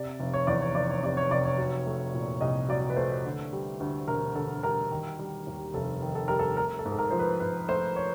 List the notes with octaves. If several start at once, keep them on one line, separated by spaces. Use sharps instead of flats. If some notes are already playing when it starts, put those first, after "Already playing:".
Already playing: C3 D5
F1
C#5
E2 D5
C#5
F1 D5
C#5
C3 D5
C#5
F1 D5
C#5
F#3
A3
A#2
C2 D#5
F#3 D5
B4
A3 C5
D3
G3
D2
E1 A#4
D3 A4
G3 A#4
D#3
G3
D#2
F1 A4
D#3
A4
G3 A#4
A4
A3 A#4
A4
G#2
A4
A#4
F3 C5
B4
G#2 B4
A3 C5
C#5